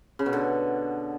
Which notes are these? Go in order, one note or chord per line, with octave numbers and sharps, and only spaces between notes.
C#3
B2
D3